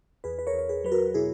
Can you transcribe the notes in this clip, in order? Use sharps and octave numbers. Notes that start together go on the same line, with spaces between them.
E2 G#4 B4
B4
A#4 C#5
E2
C#5
G#4 B4
F#3 B4
F#4 A#4
B2 E4 G#4